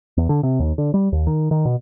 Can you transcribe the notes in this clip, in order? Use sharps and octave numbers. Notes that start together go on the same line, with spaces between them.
E2
D3
C3
D#2
D3
G3
D#2
D#3
D#3
B2